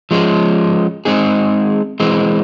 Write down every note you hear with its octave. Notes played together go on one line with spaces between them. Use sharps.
F3 G#3 C#4
G#3 C4 D#4 G#4
E3 G#3 C4